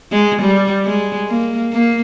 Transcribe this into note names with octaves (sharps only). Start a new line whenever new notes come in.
G#3
G3
G#3
A#3
A#3